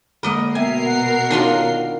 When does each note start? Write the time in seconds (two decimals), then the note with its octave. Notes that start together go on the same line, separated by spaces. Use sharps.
0.23 D3 G#3 A#3 A#4 D#5 F#5
0.55 B2 B3 A#4 E5 G#5 C7
0.85 F#5
1.30 D#3 D4 D#4 F4 F#4